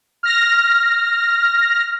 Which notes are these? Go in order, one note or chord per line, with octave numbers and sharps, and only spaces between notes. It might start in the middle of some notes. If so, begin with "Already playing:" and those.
F6 A#6